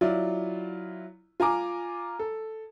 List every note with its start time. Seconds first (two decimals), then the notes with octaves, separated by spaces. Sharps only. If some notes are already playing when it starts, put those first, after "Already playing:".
0.01 F#3 E4 F4 D5
1.40 F4 G#5 A#5 D6
2.19 A4